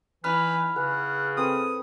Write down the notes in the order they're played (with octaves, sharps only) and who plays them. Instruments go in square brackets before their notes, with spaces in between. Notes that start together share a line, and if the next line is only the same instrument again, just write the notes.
[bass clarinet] E3 [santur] D#4 E4 [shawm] B4 [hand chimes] B5 F6
[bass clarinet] C#3 [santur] G#4 B4 [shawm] F#5
[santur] C4 A4 B4 [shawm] D#6